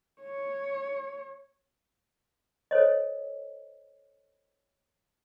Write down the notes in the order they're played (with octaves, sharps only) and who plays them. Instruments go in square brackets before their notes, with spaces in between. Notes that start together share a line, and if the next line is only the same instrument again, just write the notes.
[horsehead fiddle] C#5
[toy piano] A4 C5 C#5 D#5